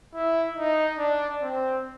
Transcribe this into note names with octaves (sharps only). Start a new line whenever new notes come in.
E4
D#4
D4
C4